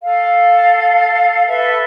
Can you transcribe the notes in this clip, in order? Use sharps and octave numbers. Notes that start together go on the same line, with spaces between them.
A4 F5
A4 B4 E5